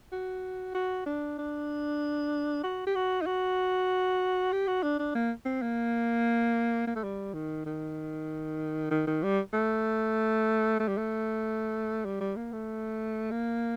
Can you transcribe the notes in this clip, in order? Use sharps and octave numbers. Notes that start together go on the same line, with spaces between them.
F#4
F#4
D4
D4
F#4
G4
F#4
D#4
F#4
G4
F#4
D4
D4
A#3
C4
A#3
A#3
A3
G3
D#3
D#3
D#3
D#3
G3
A3
A3
G3
A3
G3
G3
A#3
A3
A#3